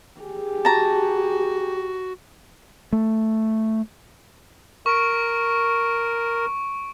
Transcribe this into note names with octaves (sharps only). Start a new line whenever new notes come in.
G4 G#4
F#4 A5 A#5
A3
A#4 C#6 D7